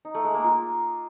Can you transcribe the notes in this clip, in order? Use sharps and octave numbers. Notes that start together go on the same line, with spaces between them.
D#4
A3
G#3
A#3
F4